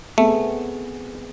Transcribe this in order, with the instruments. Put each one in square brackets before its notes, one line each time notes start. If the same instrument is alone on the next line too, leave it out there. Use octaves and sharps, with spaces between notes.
[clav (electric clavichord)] A3 [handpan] B3 C4 G#4